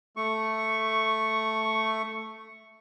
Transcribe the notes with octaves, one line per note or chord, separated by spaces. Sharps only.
A3 C#6